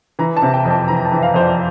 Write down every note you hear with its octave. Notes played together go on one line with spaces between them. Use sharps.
E3 A#5
A5
C3
G5
F2
A5
E3 A#5
A5
E3
F5
F2 C5
D5